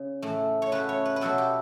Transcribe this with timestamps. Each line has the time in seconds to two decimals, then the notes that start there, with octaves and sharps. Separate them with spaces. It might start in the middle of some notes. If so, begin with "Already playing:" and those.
Already playing: C#3
0.22 A2 E3 A3
0.62 C#5
0.72 C#3 F#3 A3 B4
0.89 C#5
1.05 B4
1.16 B4
1.21 B2 F#3 A3 A4
1.38 G4